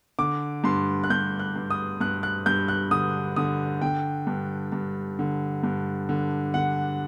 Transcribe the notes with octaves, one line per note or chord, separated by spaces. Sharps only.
D3 D6
G2 C6
F#6
G2 G6
F#6
G2
D#6
G2 F#6
F#6
G2 G6
F#6
D3 D#6
D3 D#6
D3 G5
G2
G2
D3
G2
D3
D3 F#5